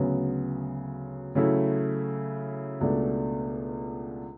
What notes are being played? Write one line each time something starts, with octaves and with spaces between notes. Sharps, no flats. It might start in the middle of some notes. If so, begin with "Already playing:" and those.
Already playing: D2 C#3 F#3 B3
C#3 F#3 A3 E4
C#2 B2 A3 D4